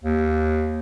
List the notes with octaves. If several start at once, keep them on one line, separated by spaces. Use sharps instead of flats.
D#2